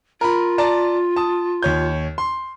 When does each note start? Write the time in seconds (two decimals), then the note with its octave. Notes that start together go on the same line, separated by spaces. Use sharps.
0.21 F4 A#4 A#5 B5
0.58 D5 A5 A#5
1.16 A5 D#6
1.63 D#2 C#5 G6
2.18 C6